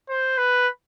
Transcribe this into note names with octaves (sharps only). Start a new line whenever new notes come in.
C5
B4